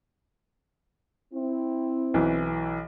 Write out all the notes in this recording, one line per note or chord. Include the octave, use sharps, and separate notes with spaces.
C4 E4
B1 E3